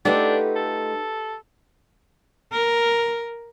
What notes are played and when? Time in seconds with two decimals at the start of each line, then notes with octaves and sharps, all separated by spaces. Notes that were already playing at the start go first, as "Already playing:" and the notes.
0.05 A3 D4 D#4 F4 G4 B4 F#5
0.56 A4
2.52 A#4